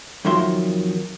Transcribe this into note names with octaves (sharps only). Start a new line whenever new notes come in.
F2 D#3 F#3 A#4 E5 C6